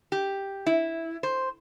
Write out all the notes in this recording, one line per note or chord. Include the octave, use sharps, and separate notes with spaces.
G4
E4
C5